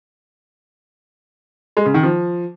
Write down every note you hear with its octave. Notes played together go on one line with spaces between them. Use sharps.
G#3
C#3
D#3
F3